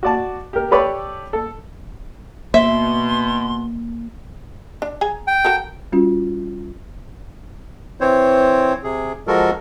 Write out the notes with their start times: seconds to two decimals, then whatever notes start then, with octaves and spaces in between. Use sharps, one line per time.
0.03 F#4 D5 A5
0.53 G4 A#4
0.71 G4 A4 B4 C#5 D5
1.33 A4
2.54 B2 A#3 E5 C6
4.82 D4
5.01 G#4 G#5 A#5
5.27 G5
5.45 F#4 A4 A#4
5.92 G3 C#4 F4 F#4
8.01 E3 C4 C5 C#5
8.84 C3 G#4
9.27 F3 G#3 F#4 A4 A#4